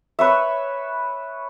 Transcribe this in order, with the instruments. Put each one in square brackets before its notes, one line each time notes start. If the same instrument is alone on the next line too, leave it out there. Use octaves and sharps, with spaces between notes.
[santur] B4 C#5 E5